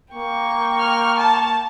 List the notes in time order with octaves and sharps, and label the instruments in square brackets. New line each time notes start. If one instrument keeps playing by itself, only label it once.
[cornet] A#3 [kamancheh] G5 C#6
[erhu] F6
A5